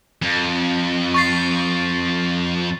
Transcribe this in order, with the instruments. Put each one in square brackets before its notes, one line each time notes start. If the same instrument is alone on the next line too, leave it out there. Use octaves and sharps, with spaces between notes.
[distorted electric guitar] F2
[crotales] C#6 A6 C7